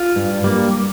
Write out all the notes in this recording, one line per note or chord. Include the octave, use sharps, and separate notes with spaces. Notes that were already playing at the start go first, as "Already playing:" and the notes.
Already playing: F4
G2
G3 A#3